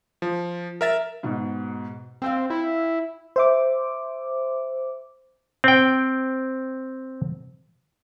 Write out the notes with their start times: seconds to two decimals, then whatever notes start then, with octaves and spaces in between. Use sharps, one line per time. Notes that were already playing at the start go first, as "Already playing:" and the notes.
0.22 F3
0.81 A#4 E5 A6
1.23 G#2 B2
2.22 C4 F5 G5 E6
2.50 E4
3.36 C5 E5 D6
5.64 C4 G5